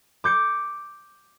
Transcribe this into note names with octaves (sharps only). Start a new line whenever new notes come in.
D6 G6 C#7